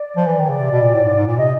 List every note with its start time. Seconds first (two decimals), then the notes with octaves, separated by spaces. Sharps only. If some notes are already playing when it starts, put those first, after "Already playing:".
Already playing: D5
0.17 F3
0.27 E3
0.39 D#3
0.44 C#5
0.49 C#3 D5
0.60 C3
0.72 B2
0.82 A#2
0.94 A2
1.04 G#2
1.16 G#2
1.27 A#2 D5
1.37 C3 D#5